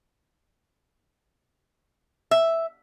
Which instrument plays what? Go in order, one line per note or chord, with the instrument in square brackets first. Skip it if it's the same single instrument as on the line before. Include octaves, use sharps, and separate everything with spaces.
[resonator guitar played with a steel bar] E5